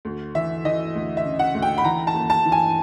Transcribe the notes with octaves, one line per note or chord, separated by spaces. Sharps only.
D2
E3 E5
E3 D#5
D2
E5
C#3
F#5
D2
G5
B5
E3 A#5
A5
D#2
A5
E3
G#5